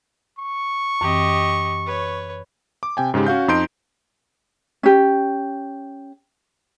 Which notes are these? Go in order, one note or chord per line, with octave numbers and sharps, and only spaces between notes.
C#6
F#2 E3 C4 G4 D#5
B4 C#5
D6
C3 G5 G#5
G#2 C#3 G#3 G4
C#4 F#4 F5 G6
F2 D#4 C6 G6 D7
C#4 G4